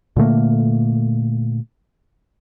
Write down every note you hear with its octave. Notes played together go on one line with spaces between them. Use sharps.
A#2 D3 A3 A#3